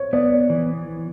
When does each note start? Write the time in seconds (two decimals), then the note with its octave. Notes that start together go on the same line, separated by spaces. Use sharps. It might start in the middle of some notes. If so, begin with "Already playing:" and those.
Already playing: C5 C#5
0.13 B3 D5
0.50 E3